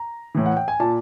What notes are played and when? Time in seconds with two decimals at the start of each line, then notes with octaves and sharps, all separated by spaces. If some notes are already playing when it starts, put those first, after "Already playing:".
Already playing: A#5
0.35 A2 E3
0.46 F#5
0.57 G5
0.68 G#5
0.80 A#2 A5